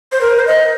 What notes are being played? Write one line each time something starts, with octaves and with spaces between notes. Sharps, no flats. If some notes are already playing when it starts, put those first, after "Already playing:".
C5
A#4
C5
D#5